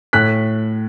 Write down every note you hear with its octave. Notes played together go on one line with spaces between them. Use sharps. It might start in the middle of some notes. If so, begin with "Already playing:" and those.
A2 F#6 B6